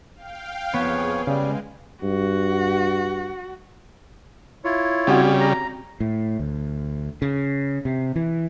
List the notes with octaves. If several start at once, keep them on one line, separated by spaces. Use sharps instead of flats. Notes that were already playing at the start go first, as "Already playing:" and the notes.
F5 G5
F2 B3 G#4 C#5
C#3 G3 G#3
G2 F#4
E4 F4 C#5
C#3 G3 C4 F#4 F#5
A#5
A2
D2
C#3
C3
E3